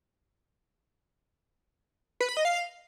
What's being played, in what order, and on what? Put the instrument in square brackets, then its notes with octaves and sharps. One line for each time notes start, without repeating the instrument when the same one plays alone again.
[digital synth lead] B4
B5
D#5
F5